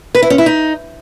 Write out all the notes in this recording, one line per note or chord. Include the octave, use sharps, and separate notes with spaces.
B4
E4
C#4
E4
D#4